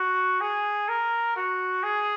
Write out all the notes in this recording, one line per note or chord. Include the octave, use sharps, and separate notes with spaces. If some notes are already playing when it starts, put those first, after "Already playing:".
Already playing: F#4
G#4
A#4
F#4
G#4